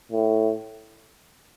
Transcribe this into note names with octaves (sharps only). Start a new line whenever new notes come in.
A2